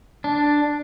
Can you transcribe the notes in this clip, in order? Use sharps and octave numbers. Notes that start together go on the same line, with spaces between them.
D4